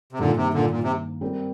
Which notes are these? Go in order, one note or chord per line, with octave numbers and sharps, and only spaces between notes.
C3
G2 A#2 D3 D#3 A#3 D#4
C3
A#2 D3
A#2
C3
G3 C4 G4 A#4